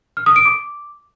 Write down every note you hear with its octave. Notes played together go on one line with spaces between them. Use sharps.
F6
D#6
D7
D6